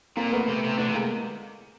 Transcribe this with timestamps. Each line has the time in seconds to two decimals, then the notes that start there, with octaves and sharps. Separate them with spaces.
0.16 A#2 A#3 C4
0.32 A3 B3
0.48 C3
0.64 C3
0.78 D3 A3 B3
0.88 C3
0.94 G#3 A#3